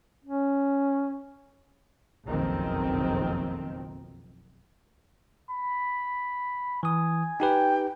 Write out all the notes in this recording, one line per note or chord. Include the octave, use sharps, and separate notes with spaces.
C#4
F#1 B1 F2 D#3 C4
B5
E3 G#5 D#6
D#4 G4 B4 G5